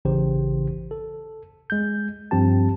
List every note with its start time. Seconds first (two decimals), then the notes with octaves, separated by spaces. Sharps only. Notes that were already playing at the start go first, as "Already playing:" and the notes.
0.05 A1 C#3 E3 G4 C5
0.91 A4
1.70 G#3 G6
2.31 G2 F3 C4 G4 A5